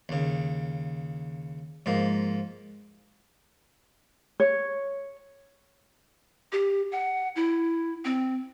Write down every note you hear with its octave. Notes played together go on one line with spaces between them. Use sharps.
D#2 C#3
G#2 F3 A#3
C#5
G4
F#5
E4
C4